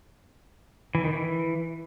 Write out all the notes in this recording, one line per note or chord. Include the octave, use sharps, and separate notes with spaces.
E3
D#3
E3